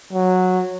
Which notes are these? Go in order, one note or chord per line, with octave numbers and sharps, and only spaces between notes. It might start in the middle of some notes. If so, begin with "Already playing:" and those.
F#3